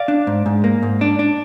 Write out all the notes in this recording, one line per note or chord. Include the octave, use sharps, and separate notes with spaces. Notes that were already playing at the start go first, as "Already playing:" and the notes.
Already playing: D5 F5
D4
G#2
G#2
A#3
G#2
D4
D4